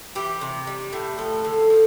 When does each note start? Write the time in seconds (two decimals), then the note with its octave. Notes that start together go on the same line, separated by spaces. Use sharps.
0.15 E3 G4
0.41 C3
0.67 G3
0.93 A2
1.18 F3 A4
1.44 D3
1.70 F3